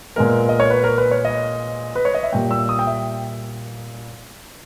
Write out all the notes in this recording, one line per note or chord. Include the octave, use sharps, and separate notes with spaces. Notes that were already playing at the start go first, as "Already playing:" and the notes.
A#2 G#3 B3 A#4
D#5
C#5
B4
A#4
B4
C#5
D#5
B4
C#5
D#5
E5
A#2 G3 A#3 G5
E6
D#6
G5
E5